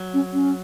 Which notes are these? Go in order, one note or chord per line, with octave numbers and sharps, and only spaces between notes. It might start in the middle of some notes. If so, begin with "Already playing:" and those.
Already playing: F#3
C#4
C#4